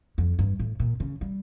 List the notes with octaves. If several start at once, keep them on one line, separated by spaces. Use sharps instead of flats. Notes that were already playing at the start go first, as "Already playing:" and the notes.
F2
G2
A2
A#2
C#3
G3